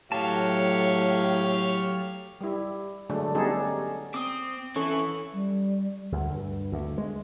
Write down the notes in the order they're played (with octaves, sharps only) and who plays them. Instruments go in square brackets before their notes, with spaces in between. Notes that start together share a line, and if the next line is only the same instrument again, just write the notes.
[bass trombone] A2 [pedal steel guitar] F#3 A5 [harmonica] G4 C#5 F5
[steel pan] G3 E4
D3 F#3 G#3 A3 D4
G3 B3 C#4 D#4 G#4 A4
C#4
[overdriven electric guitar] C4 [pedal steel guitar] D6 D#6
[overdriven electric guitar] E3 E4 [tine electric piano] C#4 A4 [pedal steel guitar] C#6
[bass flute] G3
[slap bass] D2
G2
D2
G#3